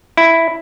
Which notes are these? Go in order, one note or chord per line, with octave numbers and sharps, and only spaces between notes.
E4